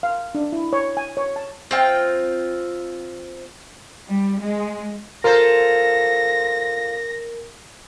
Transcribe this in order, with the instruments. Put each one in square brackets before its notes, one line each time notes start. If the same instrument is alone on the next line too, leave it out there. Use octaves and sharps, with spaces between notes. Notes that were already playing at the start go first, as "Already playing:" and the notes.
[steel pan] F5
D4
E4
C#5
G#5
C#5
A5
[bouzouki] C4 F4 G5
[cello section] G3
G#3
[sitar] F4 A4 C5 [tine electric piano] A#4 [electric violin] A#6